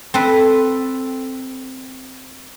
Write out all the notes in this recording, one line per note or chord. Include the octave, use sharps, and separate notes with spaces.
C4 A4 B4